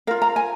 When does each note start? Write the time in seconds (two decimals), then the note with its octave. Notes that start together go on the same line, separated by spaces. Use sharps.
0.07 F4 A#4 F5
0.22 A#5
0.36 G#5